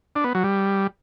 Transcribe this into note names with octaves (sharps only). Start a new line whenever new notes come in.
D4
B3
F#3
G3